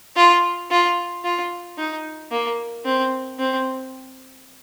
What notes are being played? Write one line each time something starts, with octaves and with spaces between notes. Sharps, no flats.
F4
F4
F4
D#4
A#3
C4
C4